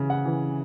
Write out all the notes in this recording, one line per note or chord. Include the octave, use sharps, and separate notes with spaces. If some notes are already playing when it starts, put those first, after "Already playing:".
Already playing: C#3 E3
F#5
E3